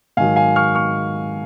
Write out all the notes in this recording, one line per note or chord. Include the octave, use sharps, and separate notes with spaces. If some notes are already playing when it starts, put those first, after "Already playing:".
G#2 D#3 F#3 F5 G#5
F5 G#5
C#6 F6
C#6 F6